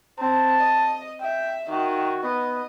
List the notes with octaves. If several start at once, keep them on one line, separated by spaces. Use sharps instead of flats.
C4 A5
D#5
E5 G5
D#3 F#4
B3 D#5